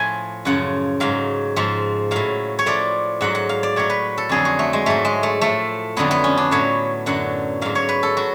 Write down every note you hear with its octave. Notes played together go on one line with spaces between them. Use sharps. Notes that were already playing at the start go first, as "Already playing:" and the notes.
Already playing: A2 F3 G#5
F#2 C#3 F3 F#5
G#2 F#3 F5
G#2 F3
A2 F#3 F5
C#5
A2 F3 D5
G#2 F#3 F#5
F#5
F5
D5
A2 F#3 C#5
B4
A4
F2 D3 F#3 G#4
F#4
A3
G#3
G#2 F#3 A3
G#3
A3
A2 F3 A3
F2 D3 F#3 B3
B3
C#4
D4
A2 F#3 C#5
F#2 D3 F#3 F#5
G#2 F#3 F5
C#5
B4
A4
F#3 F#4